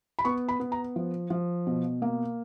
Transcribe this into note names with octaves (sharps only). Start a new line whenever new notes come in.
B5
B3 C#6
B5
B3
A#5
F3
F3
B2
A#3